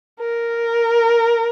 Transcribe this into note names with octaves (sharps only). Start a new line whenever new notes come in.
A#4